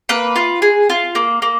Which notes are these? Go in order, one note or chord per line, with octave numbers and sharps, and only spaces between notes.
A#3 B4
F4
G#4
F4
A#3
A#3